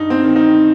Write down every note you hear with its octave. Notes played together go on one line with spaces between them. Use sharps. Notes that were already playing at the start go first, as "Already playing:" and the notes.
Already playing: G2 D#4
C4
D#3
D#4